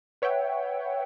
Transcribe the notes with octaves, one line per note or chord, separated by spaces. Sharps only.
B4 C#5 E5 F#5 G5